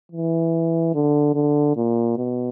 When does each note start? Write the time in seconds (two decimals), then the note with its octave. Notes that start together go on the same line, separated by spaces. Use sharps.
0.12 E3
0.95 D3
1.35 D3
1.77 A#2
2.18 B2